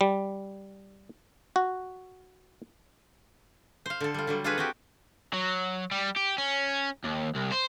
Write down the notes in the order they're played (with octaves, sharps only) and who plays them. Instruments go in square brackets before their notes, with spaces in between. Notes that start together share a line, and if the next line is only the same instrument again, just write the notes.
[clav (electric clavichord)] G3
F#4
[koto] C5 F5
D3 A4
G3 F4
D3 F#3 G3
D4 F4 F#4 G#4 B4 C#5
C4 F#4 G4
[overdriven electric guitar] F#3
G3
G4
C#4
D#2
C2
C5